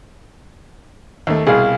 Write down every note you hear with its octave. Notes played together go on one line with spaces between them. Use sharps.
D#2 A3
C2 B2 G#4 F5